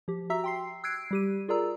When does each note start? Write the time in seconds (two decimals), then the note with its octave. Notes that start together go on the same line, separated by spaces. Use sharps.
0.08 F3 G4
0.30 F#4 E5 A#5 E6 B6
0.44 G5 C6 C7
0.84 E6 F#6 G#6 C7 D7
1.11 G3 G4 D#7
1.48 F4 G#4 A#4 D5 A#5 E6